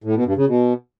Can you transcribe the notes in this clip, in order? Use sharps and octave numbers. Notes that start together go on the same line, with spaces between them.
A2
B2
G2
C#3
B2